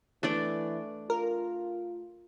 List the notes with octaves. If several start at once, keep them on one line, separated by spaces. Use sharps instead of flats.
E3 A3 D4 D5
F4 A#4